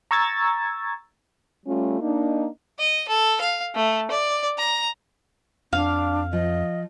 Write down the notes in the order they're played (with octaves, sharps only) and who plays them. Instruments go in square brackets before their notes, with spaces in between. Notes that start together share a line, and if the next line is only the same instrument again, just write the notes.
[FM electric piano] A#5 C#6 E6 G#6 A6
[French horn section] G3 A3 C#4 F4
A#3 D4 D#4
[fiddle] D#5
A4
F5
A3
D5
A#5
[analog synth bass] F2 [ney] D4 [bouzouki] F5
[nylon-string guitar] F3 [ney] D#5